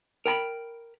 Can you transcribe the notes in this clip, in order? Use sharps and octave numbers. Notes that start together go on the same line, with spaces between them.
A#4 G5 A#5 B5